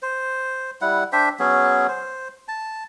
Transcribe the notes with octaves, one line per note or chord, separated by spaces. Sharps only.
C5
G3 E4 F#5
D4 C5 E5 G5
F#3 B3 C#4 G#4
C5
A5